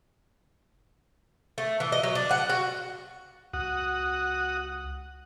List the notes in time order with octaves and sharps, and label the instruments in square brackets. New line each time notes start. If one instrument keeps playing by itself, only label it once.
[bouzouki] A3
E3
D#5
F#3
D4
F#5
F#4
[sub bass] C#2 [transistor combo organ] F#4 F#5 D#6